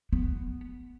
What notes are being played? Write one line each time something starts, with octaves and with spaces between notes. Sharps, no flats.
B3